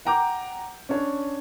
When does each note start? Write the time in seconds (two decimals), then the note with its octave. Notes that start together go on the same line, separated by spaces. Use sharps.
0.05 F#5 G5 A#5 D6 G6
0.89 C#4 D4 C#5